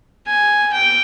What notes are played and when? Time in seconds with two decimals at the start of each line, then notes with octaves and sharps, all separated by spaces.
0.27 G#5
0.73 G5